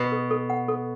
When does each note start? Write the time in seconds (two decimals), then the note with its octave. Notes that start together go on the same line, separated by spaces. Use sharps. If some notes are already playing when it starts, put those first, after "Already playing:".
Already playing: B2
0.12 A4
0.31 A4
0.50 F#5
0.68 A4